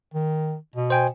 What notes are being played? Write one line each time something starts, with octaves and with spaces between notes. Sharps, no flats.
D#3
B2
C5 G5 G#5